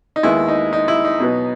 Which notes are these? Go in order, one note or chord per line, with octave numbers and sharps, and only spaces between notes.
D#4
D#2 D#3 G#3 B3 E4
D#4
D#4
E4
D#4
B2 F#3 B3